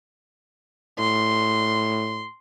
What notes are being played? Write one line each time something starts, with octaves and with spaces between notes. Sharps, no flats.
A2 C6